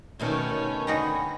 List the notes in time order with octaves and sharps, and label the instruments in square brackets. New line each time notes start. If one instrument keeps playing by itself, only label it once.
[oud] D2 B2 D#3 [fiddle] C#4 [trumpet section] A4 C#5
[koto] D3 D#4 F#4 [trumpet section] G5 G#5 B5